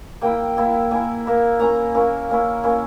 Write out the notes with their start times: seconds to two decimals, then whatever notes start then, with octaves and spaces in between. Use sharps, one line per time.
0.21 A#3 E4 G5
0.57 A#3 E4
0.91 A#3 E4 G#5
1.25 A#3 E4
1.59 A#3 C#4 E4 A#5
1.94 A#3 C#4 E4
2.30 A#3 C#4 E4
2.63 A#3 C#4 E4